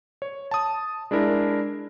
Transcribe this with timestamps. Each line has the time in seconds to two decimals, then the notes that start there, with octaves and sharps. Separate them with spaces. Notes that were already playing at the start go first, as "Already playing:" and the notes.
0.22 C#5
0.51 A5 D#6
1.11 G#3 D4 E4 A#4